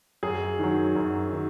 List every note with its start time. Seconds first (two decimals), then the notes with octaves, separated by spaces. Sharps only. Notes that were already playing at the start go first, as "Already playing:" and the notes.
0.23 F#2 G#4
0.59 D#3 F#3
0.96 F#2
1.32 D#3